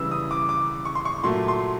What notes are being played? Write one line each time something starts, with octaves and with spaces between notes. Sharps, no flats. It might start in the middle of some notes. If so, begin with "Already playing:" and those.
Already playing: C#3 E3 G3 E6
D#6
D6
D6
C#6
C6
C#6
A#2 F#3 A3 C6
C6